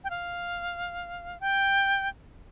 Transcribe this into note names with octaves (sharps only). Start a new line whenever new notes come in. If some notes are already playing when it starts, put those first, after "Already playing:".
G5
F5
G5